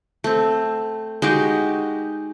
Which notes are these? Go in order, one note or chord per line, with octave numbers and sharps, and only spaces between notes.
A3 C4
G#3 D#4 F#4 G4